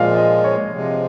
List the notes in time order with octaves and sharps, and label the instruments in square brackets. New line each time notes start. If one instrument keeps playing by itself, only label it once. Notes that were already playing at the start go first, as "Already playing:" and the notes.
Already playing: [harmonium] A#2 F3 G#3 [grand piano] F5
[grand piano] D#5
C#5
[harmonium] C3 F3 G#3